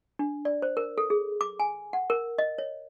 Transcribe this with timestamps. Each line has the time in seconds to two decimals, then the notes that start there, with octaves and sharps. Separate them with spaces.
0.19 D4
0.45 D5
0.62 C5
0.77 A#4
0.98 A4
1.10 G#4
1.41 D6
1.60 G#5
1.93 F#5
2.10 A#4
2.38 D#5
2.58 C#5